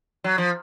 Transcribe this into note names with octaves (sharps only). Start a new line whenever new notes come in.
F#3
F3